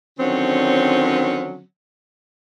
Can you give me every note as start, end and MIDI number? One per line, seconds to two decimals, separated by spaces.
0.19 1.62 50
0.19 1.62 51
0.19 1.62 53
0.19 1.62 54
0.19 1.62 60
0.19 1.62 61